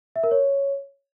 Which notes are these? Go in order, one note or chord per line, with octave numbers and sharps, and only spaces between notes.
E5
A#4
C#5